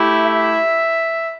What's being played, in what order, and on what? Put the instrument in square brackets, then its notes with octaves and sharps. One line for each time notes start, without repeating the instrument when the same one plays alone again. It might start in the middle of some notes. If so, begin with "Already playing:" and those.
Already playing: [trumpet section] A3 E4 G4
E5